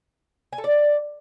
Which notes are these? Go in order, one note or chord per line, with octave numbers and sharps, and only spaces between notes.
G#5
A4
D5